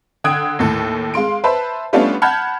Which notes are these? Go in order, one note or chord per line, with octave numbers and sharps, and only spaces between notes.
D3 G5 D#6 F#6 G#6 D7
D#2 A2 A4
G#3 F5 C6 D7
B4 C5 E5 A5 B5
G3 A3 B3 C#4 D4 F4
F#5 A5 B5 F6 G6 G#6